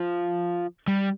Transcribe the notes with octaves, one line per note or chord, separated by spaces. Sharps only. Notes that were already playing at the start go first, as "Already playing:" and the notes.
Already playing: F3
G3